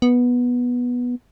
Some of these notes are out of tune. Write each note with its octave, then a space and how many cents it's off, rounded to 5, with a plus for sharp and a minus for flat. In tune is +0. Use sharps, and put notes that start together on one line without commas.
B3 -10